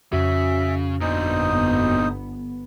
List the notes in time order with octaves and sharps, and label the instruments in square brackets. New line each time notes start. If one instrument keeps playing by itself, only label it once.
[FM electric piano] F2 F#4 [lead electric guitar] C#3 [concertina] E5
[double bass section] G1 B3 [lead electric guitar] A#2 D3 [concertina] D#4 C5 D#6